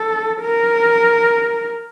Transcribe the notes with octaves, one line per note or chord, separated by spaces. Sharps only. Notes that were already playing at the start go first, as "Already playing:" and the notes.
Already playing: A4
A#4